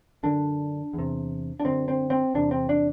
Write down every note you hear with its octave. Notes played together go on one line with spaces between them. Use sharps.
F#2 D3 D4
E2
C3
D4
F#2 D3 C4
C4
C4
E2 C3 D4
C4
D4